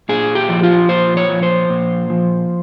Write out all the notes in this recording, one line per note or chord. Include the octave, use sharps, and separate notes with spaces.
A#2 G#4
G4
F3
F4
A#2 C5
C#5
F3
C5
A#2
F3